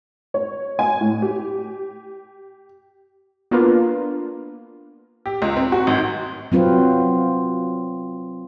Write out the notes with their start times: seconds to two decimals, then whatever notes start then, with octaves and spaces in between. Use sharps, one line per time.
0.34 C#5
0.79 G#5
1.01 A2
1.22 G4
3.51 A#3 B3 D4 F4 A#4 B4
5.26 G4
5.42 C#2
5.56 C4
5.72 F#4
5.87 G#1
6.52 F#3 C4 F4 B4